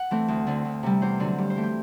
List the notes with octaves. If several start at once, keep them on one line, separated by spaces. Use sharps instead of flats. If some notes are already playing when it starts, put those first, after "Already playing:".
Already playing: F#5
E3 A3 C4
D2
D3 A3 C4
D2
C3 G3
E2 C5
D3 F#3 C4
G2 G4
C5
E3 A3
G5